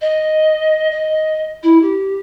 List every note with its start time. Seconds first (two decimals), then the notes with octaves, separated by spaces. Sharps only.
0.01 D#5
0.91 D#5
1.63 E4
1.81 G4